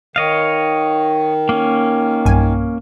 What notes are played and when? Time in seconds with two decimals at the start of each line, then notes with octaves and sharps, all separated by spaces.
0.16 D#3 C#5 D#5 F5
1.49 A#3 C#4
2.25 B1 G2 G#5